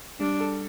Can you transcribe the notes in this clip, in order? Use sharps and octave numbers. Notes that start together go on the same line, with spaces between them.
G3 D4
A4